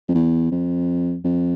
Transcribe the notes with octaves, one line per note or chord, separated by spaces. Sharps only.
F2
E2
F2
F2